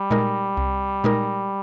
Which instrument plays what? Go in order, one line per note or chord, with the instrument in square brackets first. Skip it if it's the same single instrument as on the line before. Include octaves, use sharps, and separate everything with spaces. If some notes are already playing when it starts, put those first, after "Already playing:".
Already playing: [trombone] G3
[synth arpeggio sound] A#2 G#3 D#4 A#4
C2
A#2 G#3 D#4 A#4